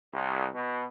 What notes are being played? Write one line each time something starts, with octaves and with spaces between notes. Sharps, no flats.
C2
B2